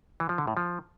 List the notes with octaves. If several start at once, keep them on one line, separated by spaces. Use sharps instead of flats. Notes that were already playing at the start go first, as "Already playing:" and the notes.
E3
F3
D3
A2
F3